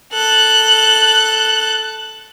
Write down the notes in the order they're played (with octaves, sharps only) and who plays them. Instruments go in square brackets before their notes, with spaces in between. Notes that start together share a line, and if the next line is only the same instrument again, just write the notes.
[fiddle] A4 F#6